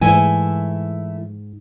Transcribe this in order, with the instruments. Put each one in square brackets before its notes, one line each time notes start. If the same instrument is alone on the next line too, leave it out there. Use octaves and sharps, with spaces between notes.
[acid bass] G#2 [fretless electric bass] E3 [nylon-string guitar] A3 E4 G#5